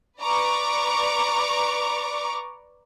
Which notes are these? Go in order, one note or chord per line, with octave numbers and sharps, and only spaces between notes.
B4 D5 A#5 C#6 D6